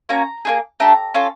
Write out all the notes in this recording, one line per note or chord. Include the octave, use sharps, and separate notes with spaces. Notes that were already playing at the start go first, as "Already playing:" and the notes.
A#3 C#4 F#4 A#5
A#3 D#4 G#4
A3 D4 G4 A#5
C#4 F4 A4